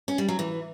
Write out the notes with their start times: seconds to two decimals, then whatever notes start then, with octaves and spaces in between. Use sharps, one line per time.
0.08 C#4
0.18 G3
0.29 F#3
0.39 E3